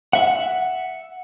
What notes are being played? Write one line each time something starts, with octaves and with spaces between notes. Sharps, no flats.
E5 F#5